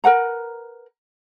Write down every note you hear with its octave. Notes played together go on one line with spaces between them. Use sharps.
A#4 B4 F#5 A#5